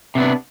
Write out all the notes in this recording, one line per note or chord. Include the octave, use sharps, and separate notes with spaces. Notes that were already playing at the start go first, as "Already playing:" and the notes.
C3 B3 D4